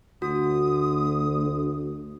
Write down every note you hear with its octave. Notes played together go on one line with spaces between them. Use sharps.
D2 F#4 D#6